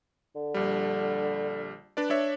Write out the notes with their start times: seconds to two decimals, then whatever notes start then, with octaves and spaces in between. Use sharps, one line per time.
0.35 D3
0.54 A#1 G3
1.97 D4 B4 D5
2.10 D4 C#5 E5